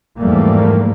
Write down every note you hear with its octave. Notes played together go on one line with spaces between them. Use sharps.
E2 G#2 F3 G3 A3 A#3